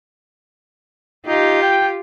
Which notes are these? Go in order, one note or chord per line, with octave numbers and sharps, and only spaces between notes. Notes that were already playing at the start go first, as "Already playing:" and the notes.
D#4 F4 G4
G5